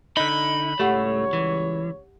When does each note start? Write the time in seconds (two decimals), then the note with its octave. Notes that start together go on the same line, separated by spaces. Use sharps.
0.17 D3 D#4 D#5 B5
0.80 C#2 A2 G3 A3 G4 C#5 F#5
1.33 E3